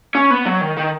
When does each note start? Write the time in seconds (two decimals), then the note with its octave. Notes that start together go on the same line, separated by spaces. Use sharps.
0.15 C#4
0.31 B3
0.46 F#3
0.61 D#3
0.77 D#3